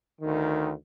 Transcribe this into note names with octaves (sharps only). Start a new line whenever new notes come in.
D2 D#3